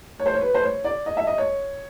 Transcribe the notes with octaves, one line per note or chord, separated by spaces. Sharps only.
C#5
C5
C#5
B4
C5
C#5
D5
D#5
E5
D#5
C#5